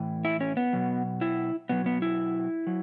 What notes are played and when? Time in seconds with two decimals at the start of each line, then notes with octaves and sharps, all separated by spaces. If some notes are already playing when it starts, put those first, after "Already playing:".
Already playing: A2 E3
0.25 E4
0.41 C#4
0.57 B3
0.73 B2 F#3
1.21 E4
1.69 B2 F#3 B3
1.86 B3
2.02 E4
2.67 F#3